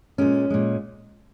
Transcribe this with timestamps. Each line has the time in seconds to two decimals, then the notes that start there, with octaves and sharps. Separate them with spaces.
0.18 A#2 G#3 C#4
0.50 A#2 G#3